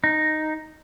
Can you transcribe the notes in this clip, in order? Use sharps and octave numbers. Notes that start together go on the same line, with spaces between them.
D#4